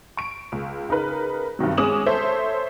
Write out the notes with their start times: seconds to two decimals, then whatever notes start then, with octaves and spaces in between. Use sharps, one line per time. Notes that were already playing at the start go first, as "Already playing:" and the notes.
0.17 C#6 D7
0.52 C#2
0.89 C#3 D#4 A#4 B4
1.59 G2 C3 D#3 F#3
1.78 G#3 C#4 D6 D#6 E7 F#7
2.06 A4 C5 C#5 E5